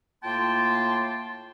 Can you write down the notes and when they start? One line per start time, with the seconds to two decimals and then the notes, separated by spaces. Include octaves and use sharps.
0.24 A2 A#3 F4 G5 A5 C6